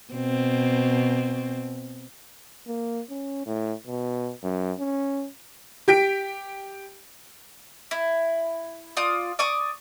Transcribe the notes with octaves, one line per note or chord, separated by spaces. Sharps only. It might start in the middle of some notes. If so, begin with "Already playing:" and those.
B2 C4
A#3
C#4
A2
B2
F#2
C#4
G4 G5 B6 D7
E4
F4 D5 D#6
D5 C#6 D#6